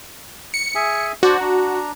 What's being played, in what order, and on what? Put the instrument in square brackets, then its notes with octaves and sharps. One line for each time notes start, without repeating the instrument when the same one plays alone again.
[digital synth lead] C#7
[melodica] G#4 E5 G#5
[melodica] D4 C5 D5 [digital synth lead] F#4
[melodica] D4 A#5